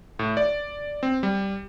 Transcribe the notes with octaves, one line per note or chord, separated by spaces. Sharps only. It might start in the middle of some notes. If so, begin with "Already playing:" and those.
A2
D5
C4
G3